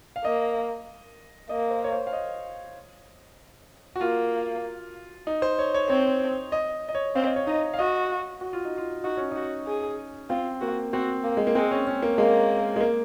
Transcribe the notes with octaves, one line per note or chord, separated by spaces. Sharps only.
F5
A#3 D#5
A#3 D#5
C5
C#5
C5
F5
D#5
F#4
A#3 F4
D#4
C5
C#5
C#5
C4 C#5
D#5
D#5
C#5
C4 F5
D#5
C#5
D#4 D#5
F5
F#4 D#5
F#4
F4
D#4
F4
D#4 F#4
C#4
D#4 F#4
G#4
C4 F4
A#3 F#4
C4 F#4
A#3
G#3
A#3
G#3 C4
C#4
C#4
A#3
G#3 A#3
G#3
A#3